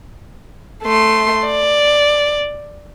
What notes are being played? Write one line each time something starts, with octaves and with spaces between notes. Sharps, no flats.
A3 C6
D5